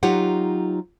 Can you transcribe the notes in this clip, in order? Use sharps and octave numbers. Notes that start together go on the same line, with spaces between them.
F#3 D#4 F4 G4 F#5